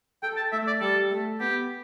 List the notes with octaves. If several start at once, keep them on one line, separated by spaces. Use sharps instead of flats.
A4 G5
A5
A3 E5
D5
G3 A4
A3
B3 G4